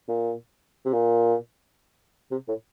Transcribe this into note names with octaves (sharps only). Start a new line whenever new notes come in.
A#2
C3
A#2
C3
A2